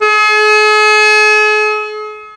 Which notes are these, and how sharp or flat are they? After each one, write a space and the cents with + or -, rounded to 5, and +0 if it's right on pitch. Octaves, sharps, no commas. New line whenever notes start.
G#4 +45